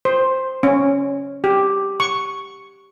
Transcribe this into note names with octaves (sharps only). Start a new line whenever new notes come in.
C5
C#4
G4
C#6